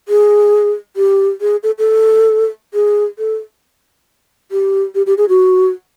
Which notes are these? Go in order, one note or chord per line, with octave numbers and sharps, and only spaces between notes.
G#4
G4
G#4
A4
A4
G#4
A4
G4
G4
G4
G#4
F#4